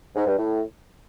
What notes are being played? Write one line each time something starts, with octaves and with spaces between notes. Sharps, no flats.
G#2
G2
A2